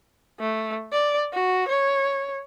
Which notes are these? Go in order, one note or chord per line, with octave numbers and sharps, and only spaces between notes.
A3
D5
F#4
C#5